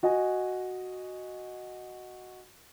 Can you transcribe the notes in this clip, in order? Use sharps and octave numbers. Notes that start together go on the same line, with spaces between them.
F#4 D#5 G#5